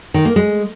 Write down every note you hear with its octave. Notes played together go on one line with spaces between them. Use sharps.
D#3
A#3
G#3